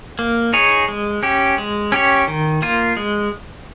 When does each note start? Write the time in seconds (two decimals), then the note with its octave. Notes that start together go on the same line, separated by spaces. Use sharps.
0.19 A#3
0.53 D#4 G#4 C#5
0.88 G#3
1.23 C#4 G4
1.58 G#3
1.92 C#4 G4 C#5
2.28 D#3
2.62 A#3 F4
2.97 G#3